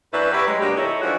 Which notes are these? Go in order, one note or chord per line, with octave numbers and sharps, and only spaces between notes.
F#2 D4 E4 B4
E4 F#4 G4 B4
F#3 G#3
B2 F#3 A#3 D4 G4
D#3 G#3 E4 A4 C#5
E3 F3 G#3 D4 F#4